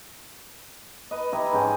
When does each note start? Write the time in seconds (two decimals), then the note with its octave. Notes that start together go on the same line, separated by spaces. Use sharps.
1.11 B4 D#5
1.33 E4 G4 D#5 A#5
1.53 G#2 C#4 G5 G#5